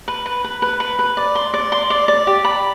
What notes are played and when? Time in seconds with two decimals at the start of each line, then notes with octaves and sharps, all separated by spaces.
0.08 B4
0.26 B4
0.44 B4
0.62 B4
0.80 B4
0.99 B4
1.17 D5
1.35 C6
1.54 D5
1.72 C6
1.90 D5
2.08 D5
2.27 G4
2.44 B5